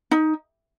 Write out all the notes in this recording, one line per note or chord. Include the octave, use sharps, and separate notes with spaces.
D#4